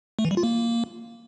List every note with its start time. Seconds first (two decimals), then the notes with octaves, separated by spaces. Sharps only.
0.19 A3
0.25 E3
0.31 G3
0.37 F4
0.43 A#3